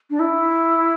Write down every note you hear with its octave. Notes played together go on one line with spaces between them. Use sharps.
D4
E4